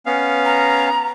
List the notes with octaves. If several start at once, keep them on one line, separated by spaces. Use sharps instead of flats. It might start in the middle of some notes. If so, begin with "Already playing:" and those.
B3 C#4 F5
A#5